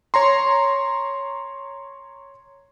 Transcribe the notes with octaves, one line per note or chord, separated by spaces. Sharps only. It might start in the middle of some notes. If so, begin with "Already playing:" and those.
C#5 A#5 C6